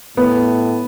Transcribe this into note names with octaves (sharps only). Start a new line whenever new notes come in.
A2 B3